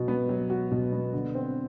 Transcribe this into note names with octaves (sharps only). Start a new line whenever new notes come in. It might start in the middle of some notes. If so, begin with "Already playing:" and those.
Already playing: B2 F#3 F#4
B3
F#3
F#4
B2
B3
D3
C4